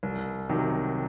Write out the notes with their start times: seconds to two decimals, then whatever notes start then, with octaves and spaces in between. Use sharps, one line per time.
0.03 C2
0.49 C3 D#3 F#3